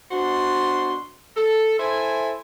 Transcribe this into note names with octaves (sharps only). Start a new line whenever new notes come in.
B2 D4 F#4 C5 C6
A4
E4 A4 C5 E5 G#5